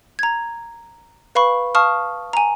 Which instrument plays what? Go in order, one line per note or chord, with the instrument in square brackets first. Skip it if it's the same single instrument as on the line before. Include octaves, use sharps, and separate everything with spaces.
[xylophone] A#5 G#6
B4 F5 B5 C#6
F5 A5 C#6 D#6 F6
G#5 A#5